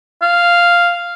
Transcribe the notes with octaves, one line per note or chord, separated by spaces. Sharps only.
F5